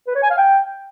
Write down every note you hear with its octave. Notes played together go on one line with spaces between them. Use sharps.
B4
C#5
G#5
F5
G5